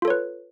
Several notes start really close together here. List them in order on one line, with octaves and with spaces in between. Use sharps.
F4 A4 C#5 B4